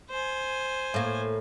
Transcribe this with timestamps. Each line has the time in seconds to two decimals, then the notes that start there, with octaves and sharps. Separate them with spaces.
0.10 C5 G#5
0.94 A2 A#3